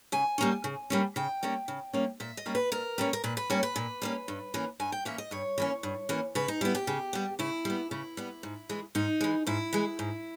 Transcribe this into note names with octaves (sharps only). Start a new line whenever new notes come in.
C#3 G#5
G3 A#3 C#4
C#3
G3 A#3 C#4
C#3 G5
G3 A#3 C#4
C#3
G3 A#3 C#4
A#2 E5
D#5
G3 A#3 C#4
B4
A#2 A#4
G3 A#3 C#4
A#4
A#2 B4
B4
G3 A#3 C#4 C#5
B4
A#2
G3 A#3 C#4
G2
E3 A#3 C#4
G2 G#5
G5
E3 A#3 C#4 E5
D#5
G2 C#5
E3 A#3 C#4
G2
E3 A#3 C#4
C#3 B4
D#4
G3 B3 E4
G4
C#3
G3 B3
C#3 E4
G3 B3
C#3 E4
G3 B3
G#2
E3 G#3
G#2 D#4
E3 G#3
G#2 E4
E3 G#3
G#2